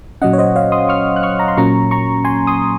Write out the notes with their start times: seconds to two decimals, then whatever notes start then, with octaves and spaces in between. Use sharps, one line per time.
0.22 A#2 F#3 C#4 D#5 F#5
0.33 C#5
0.38 C5 D#5
0.56 C#5 F5
0.72 C6 D#6
0.89 C#6 F6
1.16 F#6
1.23 C#6 F6
1.39 A#5
1.48 C6
1.57 A#2 F#3 A#3 C#4 A#5 C#6
1.91 A#5 C#6
2.25 G#5 C6
2.47 C6 D#6